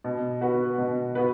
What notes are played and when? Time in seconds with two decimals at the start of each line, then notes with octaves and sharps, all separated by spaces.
0.04 B2
0.41 B3 F#4 B4
0.78 B2
1.15 B3 F#4 B4